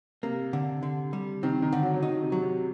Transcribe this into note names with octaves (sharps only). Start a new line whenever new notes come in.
C3 A#3
D3
D3
G3
D#3 C4
D#3
D3
F#3
F#3
D#3 D#4
C3
F#3
C3